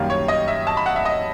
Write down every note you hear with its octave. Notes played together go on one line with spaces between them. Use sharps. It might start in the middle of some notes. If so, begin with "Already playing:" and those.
Already playing: F#2 D#3 G3 A#3 F5
C#5
D#5
E5
A5
B5
F#5
E5
D#5